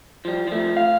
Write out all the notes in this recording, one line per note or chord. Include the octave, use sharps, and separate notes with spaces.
F3 G3
F3 A3
F5